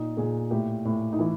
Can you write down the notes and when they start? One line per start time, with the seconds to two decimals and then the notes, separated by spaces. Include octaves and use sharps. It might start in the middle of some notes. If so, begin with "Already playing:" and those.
Already playing: A#2 D#4
0.17 A#2 G#4
0.51 A2 G4
0.85 A2
1.13 D#4
1.19 E3 E4